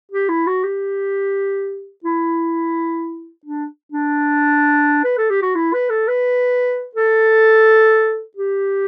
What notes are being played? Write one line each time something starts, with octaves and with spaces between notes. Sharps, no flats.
G4
E4
F#4
G4
E4
D4
D4
B4
A4
G4
F#4
E4
B4
A4
B4
A4
G4